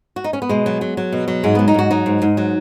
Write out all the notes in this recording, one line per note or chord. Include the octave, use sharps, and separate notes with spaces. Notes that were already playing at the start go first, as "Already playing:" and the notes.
F#4
D#4
C#4
B3
B2 G#3
F#3
F#3
F#3
B2
F#3
G#2 G#3
F#3 B3
D#4
G#2 F#4
F#3 D#4
G#2
G#2
F#3